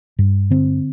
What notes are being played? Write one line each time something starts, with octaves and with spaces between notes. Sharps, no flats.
G2
D3 C4